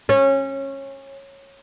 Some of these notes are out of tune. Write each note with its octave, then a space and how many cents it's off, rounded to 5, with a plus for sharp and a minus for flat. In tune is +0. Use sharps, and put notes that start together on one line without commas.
C#4 -20